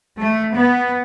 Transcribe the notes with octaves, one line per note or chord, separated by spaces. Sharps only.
A3
B3